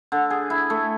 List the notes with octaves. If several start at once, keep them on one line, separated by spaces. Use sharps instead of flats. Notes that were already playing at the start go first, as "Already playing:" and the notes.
D3
G#4
E4
A3